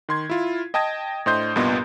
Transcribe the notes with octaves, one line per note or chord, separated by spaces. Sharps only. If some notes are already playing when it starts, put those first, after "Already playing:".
D#3 C6 G#6
E4 F4
D#5 G5 A5 D#6 G#6 A#6
A2 D4 C5 D#5 C6 G6
C2 G2 A#2 B3 D#5 C6